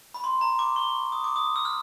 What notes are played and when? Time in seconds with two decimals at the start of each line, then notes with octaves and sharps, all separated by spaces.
0.14 B5
0.24 C6
0.41 A#5
0.59 D6
0.76 C#6
1.12 D#6
1.24 D6
1.36 D#6
1.56 E6
1.65 F6